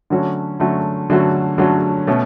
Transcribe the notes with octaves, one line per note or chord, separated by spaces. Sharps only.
D3 F#3 A3 C#4 F#4
D3 F#3 A3 C#4 F#4
D3 F#3 A3 C#4 F#4
D3 F#3 A3 C#4 F#4
B2 A3 C#4